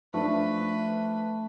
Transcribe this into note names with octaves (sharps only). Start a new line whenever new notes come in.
F3 A3 D4 B4